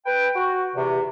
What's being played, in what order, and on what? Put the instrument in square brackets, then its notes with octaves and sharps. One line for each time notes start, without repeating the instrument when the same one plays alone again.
[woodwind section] B4 G5
F#4
E2 C3